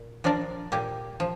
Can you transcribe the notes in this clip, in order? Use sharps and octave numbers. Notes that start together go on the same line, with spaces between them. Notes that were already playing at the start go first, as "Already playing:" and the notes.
Already playing: A#2
F3 D4 A#4 D5
A#2 A#3 G4
F3